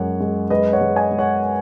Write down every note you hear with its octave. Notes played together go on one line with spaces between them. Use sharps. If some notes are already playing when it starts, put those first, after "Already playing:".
Already playing: F#2 G#3 C#5 F#5
G#3
G#3 B4 D#5
C#5 F#5
G#3
D#5 G#5
G#3
C#5 F#5